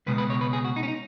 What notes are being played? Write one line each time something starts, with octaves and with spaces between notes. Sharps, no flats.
C#2 B2 G#3 B3 B4
B4
C#5
B4
G#4
F#4
D#4
C#4
D#4